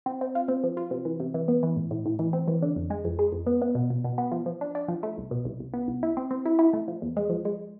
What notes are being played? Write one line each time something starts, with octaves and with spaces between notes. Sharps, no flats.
C4
C4
F4
C4
F3
F4
C3
E3
C3
E3
B3
E3
A2
A2
A2
E3
C4
E3
D3
F2
G#3
F2
G#3
F2
B3
B3
B2
B2
B2
B3
F3
F3
D4
D4
F3
A3
C2
B2
C2
C2
B3
C2
E4
C4
C4
E4
E4
A3
F3
E2
G#3
F3
G#3